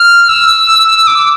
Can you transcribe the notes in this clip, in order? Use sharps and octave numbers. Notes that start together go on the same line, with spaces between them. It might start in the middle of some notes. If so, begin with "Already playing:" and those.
Already playing: F6
E6
D6
D6